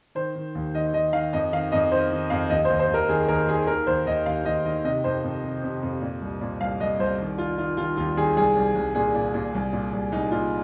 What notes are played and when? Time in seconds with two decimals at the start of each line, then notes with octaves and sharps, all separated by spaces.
0.15 D#3 C5
0.36 D#3
0.55 D#2
0.74 D#3 D#5
0.94 D#3 D#5
1.13 D#3 F5
1.33 F2 D#5
1.53 D#3 F5
1.72 F2 D#5
1.92 D#3 C5
2.11 D#3
2.30 F2 F5
2.50 D#2 D#5
2.65 D#2 C5
2.79 C5
2.89 D#2
2.94 A#4
3.09 D#3 G#4
3.28 D#2 A#4
3.47 D#3 G#4
3.67 D#3 A#4
3.87 D#2 C5
4.07 D#2 D#5
4.26 D#2 F5
4.45 D#2 D#5
4.66 D#3 D#5
4.84 C3 D#5
5.04 F2 C5
5.24 F2
5.43 C3
5.63 C3
5.83 F2
6.01 A#2
6.21 C2
6.41 A#2
6.61 C2 F5
6.80 C2 D#5
6.99 C2 C5
7.20 D#3
7.38 D#3 F4
7.58 D#3 F4
7.77 D#3 F4
7.97 D#2 F4
8.17 D#3 G#4
8.37 C2 G#4
8.56 C2
8.75 C2
8.95 A#2 G#4
9.14 A#2
9.34 A#2
9.54 C2
9.73 A#2
9.93 C2
10.12 C2 D#4
10.31 A#2 F4